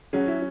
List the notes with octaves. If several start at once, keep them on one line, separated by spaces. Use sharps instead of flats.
F#3 C#4 F#4 G#4
E4